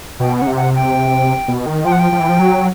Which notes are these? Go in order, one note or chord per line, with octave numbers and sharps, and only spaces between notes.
B2 G5
C#3 F#5
C3
F#5
G5
B2
D#3
F3 G5
F#5
G5
F3
E3
F3
F#3